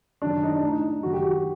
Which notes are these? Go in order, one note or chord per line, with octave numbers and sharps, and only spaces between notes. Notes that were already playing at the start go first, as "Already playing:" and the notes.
F#2 D#3 D4
D#4
D4
A2
D#4
F#2 D#3 F#4
G4
F#4